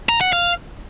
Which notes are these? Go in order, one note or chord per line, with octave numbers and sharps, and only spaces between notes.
A#5
F#5
F5